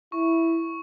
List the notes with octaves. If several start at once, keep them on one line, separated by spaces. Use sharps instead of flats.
E4 C#6